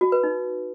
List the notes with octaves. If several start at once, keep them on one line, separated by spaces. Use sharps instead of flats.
F#4
B4
D#4